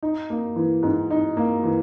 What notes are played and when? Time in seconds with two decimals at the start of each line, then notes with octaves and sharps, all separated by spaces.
0.03 D#4
0.30 A#3
0.56 E3
0.83 G#2
1.10 D#4
1.37 A#3
1.64 E3